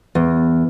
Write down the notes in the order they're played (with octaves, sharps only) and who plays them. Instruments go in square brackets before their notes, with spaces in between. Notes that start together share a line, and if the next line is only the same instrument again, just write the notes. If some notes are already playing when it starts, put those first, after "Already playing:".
[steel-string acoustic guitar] E2